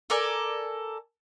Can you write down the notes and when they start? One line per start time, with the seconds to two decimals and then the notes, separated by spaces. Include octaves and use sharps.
0.10 A4 A#4 D5 G#5